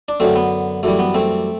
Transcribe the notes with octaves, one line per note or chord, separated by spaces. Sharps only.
D4
F#2 D3 F#3 A3 C4
B3
F#2 E3 G3 A3
B3
A3 C4